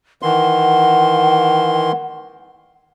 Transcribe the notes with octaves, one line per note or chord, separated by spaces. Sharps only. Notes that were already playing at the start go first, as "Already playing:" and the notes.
D#3 E3 F#5 C6